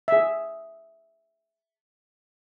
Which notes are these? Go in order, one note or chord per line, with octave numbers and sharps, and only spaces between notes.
G#4 E5